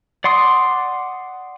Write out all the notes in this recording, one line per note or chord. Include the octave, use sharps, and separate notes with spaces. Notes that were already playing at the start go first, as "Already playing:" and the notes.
D5 F#5 C6 D6 D#6